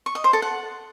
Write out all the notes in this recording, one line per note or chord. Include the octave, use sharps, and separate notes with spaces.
C#6
D#5
C5
A4
F#5